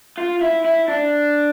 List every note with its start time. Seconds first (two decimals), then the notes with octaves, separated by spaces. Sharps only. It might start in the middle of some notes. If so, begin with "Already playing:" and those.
0.18 F4
0.41 E4
0.65 E4
0.88 D4